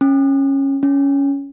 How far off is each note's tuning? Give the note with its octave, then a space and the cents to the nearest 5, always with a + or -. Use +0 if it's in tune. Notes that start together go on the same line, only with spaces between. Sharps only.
C#4 -15
C#4 +10